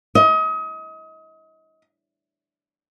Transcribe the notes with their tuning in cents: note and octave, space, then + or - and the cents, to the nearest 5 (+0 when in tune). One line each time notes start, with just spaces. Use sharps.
D#5 +35